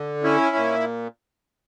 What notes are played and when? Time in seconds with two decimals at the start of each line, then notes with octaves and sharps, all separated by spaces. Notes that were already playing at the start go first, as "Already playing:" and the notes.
Already playing: D3
0.24 C#4 E4
0.56 A#2